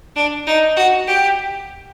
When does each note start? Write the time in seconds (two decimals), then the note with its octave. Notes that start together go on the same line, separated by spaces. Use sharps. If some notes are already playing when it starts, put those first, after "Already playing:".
0.16 D4
0.47 D#4
0.76 F#4
1.07 G4